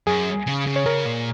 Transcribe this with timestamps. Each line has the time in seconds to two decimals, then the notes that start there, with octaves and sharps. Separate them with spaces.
0.07 F#2 G#4
0.47 C#3
0.67 C#3
0.76 C#5
0.86 C#3 A#4
1.06 A#2